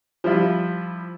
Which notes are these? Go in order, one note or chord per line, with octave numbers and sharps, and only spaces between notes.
F3 G3 E4 F4